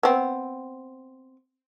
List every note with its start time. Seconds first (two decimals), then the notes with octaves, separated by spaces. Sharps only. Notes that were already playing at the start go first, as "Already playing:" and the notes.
0.03 B3 C4